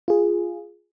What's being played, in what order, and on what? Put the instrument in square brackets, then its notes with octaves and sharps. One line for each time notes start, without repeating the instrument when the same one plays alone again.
[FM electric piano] F4 G#4